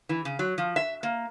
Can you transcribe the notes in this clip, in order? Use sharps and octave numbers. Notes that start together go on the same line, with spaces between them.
E3
C#3
F#3
F3
E5
A#3